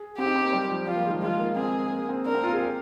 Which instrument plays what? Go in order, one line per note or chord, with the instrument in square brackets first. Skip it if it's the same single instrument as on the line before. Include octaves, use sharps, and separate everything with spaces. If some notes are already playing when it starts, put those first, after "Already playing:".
Already playing: [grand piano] G#4
[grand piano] C4 [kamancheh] G4
[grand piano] D#4
C4
A#3
G3
F3
[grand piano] G3 [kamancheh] F4
[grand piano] A#3
G#3
D#3
F3
[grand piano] G#3 [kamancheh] F4
[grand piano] A#3
[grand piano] C4 [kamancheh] G#4
[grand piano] A#3
A#3
C4
[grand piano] D4 [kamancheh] A#4
[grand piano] C4
F4
G#4
G4